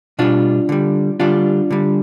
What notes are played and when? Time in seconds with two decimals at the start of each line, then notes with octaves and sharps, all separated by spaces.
0.19 B2 G3 D4 F4
0.69 D3 G3
1.20 D3 G3 D4 F4
1.71 D3 G3